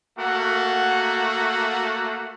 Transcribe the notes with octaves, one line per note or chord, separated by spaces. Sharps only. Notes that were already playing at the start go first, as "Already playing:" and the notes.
A3 A#3 F#4 F#5